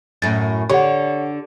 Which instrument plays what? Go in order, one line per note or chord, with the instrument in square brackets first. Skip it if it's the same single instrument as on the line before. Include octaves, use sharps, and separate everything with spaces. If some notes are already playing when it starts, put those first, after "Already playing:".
[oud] F#2 A2 [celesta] A6
[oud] D3 [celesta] G4 F#5 [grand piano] C#5